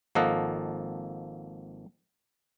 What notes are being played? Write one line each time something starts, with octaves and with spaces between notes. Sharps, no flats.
G#1 F3 A#3 A4 D#5 F#5